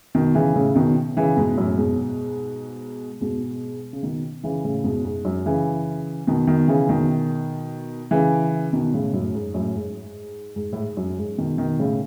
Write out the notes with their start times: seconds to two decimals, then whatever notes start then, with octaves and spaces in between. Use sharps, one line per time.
0.15 B2 D#3
0.35 C#3 E3
0.55 A2 C#3
0.75 B2 D#3
1.17 C#3 E3
1.37 G#2 B2
1.57 F#2 A2
1.77 G#2 B2
3.21 G#2 B2
3.93 C#3
4.03 B2 D#3
4.44 C#3 E3
4.65 A2 C#3
4.84 G#2 B2
5.05 G#2
5.25 F#2
5.46 C#3 E3
6.27 B2 D#3
6.47 B2 D#3
6.68 C#3 E3
6.89 B2 D#3
8.11 C#3 E3
8.73 B2 D#3
8.94 A2 C#3
9.13 F#2 A2
9.34 G#2
9.54 F#2 A2
9.75 G#2
10.56 G#2
10.73 A2
10.76 G#2
10.97 F#2
11.18 G#2
11.38 B2 D#3
11.58 B2 D#3
11.79 A2 C#3